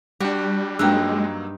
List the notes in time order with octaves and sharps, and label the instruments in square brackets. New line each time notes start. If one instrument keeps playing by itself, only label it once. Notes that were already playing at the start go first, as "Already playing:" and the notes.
[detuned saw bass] G3 [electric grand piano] D4 G4 [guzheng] F#4
[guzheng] G2 D#4 [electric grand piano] F#3 A#3 E6 [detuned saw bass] G#3 [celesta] G5 F#6